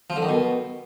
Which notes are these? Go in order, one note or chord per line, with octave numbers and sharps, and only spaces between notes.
F3
D3
D#3
B2